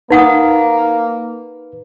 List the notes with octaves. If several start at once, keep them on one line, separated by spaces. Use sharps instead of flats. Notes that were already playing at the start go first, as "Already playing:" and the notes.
A#3 D#4 B4 F#5 D#6